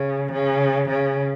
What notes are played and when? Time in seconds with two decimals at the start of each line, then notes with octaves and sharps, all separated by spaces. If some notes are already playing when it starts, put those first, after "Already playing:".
Already playing: C#3
0.32 C#3
0.89 C#3